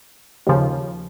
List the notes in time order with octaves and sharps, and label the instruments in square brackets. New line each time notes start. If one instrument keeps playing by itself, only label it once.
[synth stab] D#2 C#3 F3